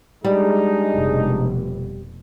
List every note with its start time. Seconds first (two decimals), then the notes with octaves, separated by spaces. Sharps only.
0.24 G3 G#3 D4 D#4
0.95 F1 B2